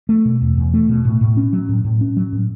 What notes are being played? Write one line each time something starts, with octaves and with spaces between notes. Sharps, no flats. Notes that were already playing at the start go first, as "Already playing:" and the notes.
A3
B2
E2
E2
A3
B2
A2
A2
C#4
F#3
A2
A2
C#4
F#3
A2